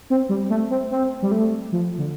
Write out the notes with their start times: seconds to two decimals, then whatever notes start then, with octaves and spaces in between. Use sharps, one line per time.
0.10 C4
0.29 G3
0.50 A3
0.70 C4
0.91 C4
1.22 G3
1.32 A3
1.72 F3
1.98 D3